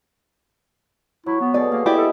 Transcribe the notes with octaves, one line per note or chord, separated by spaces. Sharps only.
F#3 E4
B3
B2 G#4 A4 D5
A#3 F5
E4 G4 D5 D#5
A4